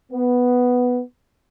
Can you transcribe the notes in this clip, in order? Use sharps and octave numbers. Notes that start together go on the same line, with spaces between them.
B3